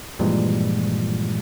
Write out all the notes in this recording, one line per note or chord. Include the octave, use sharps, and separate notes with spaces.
G2 A#2 E3 F3 G3 G#3